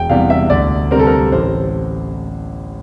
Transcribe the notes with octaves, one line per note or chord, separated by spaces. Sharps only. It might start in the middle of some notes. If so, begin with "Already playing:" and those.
Already playing: E1 G5
E2 C3 G3 F5
E5
D2 D5
C3 G3 C4 A#4
A4
A#4
A1 C5